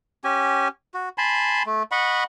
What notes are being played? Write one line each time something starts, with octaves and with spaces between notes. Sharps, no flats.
C#4 G4 G#5
F#4
G#5 A5 B5 C6
A3
D#5 F#5 B5 C#6